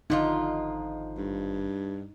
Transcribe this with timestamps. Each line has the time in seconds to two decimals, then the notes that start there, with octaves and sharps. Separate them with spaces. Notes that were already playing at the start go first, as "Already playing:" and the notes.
0.10 G#1 D3 F3 D#4 F4
1.17 G2